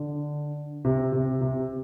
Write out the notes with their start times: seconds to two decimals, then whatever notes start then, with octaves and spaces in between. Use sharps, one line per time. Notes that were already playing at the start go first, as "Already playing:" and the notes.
Already playing: D3
0.85 C3
1.12 C3
1.41 C3